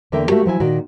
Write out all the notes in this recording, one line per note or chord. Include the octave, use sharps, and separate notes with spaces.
E2 D3 A#3 A4 E5 G5
A3 A#3 F#4 G4 A#4
F3 F#3 E4 G#5
A#2 D#3 F#4